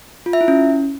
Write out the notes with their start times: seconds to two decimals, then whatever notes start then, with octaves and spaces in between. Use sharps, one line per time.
0.26 F4
0.33 E5
0.41 E4
0.48 C#4